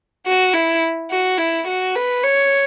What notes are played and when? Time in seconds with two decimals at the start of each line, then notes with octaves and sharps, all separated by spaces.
0.26 F#4
0.53 E4
1.10 F#4
1.38 E4
1.67 F#4
1.95 B4
2.23 C#5